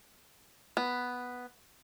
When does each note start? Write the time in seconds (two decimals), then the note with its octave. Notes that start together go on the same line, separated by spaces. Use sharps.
0.77 B3